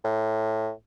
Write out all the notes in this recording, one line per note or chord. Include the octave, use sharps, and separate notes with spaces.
A2